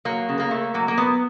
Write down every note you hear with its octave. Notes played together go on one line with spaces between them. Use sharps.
F#3 A#3
C#3
A#3
A3
F#3 A#3
A#3
F#3 B3